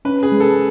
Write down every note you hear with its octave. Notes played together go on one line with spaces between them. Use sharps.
C#4 B4
G#4
G#3
A4